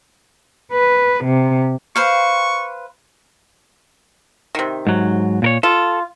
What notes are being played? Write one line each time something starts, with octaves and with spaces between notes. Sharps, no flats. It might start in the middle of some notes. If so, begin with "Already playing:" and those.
B4
C3
B4 C5 F5 C#6
C3 D#3
G#2 F#3
A#2 A#4 C#5
F4 A4